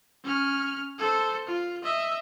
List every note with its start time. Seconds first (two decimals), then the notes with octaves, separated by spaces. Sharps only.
0.24 C#4 F6
0.98 A4 C5
1.46 F4
1.83 D#5 E5